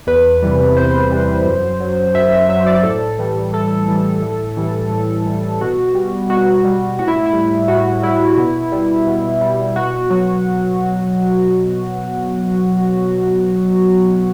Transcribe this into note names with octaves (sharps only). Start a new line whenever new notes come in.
E2 B4
C3 E3 G3
E2 C5
C3 E3 G3
F#2
F#3
F#2 E5
E5
F#3 E5
C5
D5
A2 A4
E3 G3
A2 A4
E3 G3
A2
E3 G3
A2
E3 G3
B2 F#4
G3
B2 F#4
G3
A2 F#4
E4
E4
G3
A2 F#4
G3 E4
B2
G3
B2
G3
B2 F#4
F#3 F#4